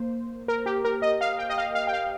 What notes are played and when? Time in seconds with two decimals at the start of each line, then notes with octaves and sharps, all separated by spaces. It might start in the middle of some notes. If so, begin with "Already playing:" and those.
Already playing: A#3 C5
0.48 A#4
0.66 G4
0.85 A#4
1.02 D#5
1.21 F5
1.39 G5
1.49 D#5
1.58 F5
1.75 F5
1.87 G5
1.93 F5